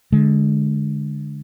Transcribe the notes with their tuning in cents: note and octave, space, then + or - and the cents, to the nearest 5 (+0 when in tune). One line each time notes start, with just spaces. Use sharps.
D3 +0 G#3 +15